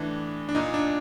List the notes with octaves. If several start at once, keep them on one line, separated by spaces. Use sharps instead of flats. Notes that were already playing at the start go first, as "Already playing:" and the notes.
Already playing: A2 E3 D4
D4
A#2 D#4
D4